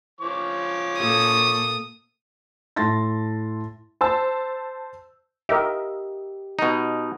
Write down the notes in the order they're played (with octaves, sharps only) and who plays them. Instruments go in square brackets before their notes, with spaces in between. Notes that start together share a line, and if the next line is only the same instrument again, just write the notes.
[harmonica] F3 C#5 D6
[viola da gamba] A#2 A#3 A4 [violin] D#6
[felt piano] A2 A5 C6 A6 A#6
[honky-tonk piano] C5 A5 E6
[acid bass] G4 [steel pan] A#4 D#5 E5
[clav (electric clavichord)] B2 D#4